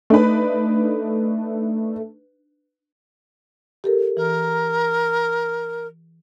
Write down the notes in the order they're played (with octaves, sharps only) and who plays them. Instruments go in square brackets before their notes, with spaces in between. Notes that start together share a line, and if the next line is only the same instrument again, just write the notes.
[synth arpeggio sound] A3 [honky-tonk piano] D4 D#4 B4
[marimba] G4 A4 A#4
[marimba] E3 [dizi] A#4